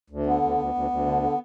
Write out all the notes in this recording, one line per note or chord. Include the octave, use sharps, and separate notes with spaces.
D2
D3 B3
D2
D2
D2
D2
D3
D3